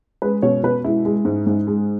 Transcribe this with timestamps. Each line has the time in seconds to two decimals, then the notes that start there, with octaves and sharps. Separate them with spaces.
0.22 G#3 B4
0.42 B2 C#5
0.63 B2 B4
0.84 G#3 E4
1.05 G#3
1.25 G#2
1.47 G#2
1.67 G#3